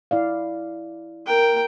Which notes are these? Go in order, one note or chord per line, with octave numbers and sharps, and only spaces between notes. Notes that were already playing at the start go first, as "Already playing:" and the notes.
E4 D5 F5
A#4 G5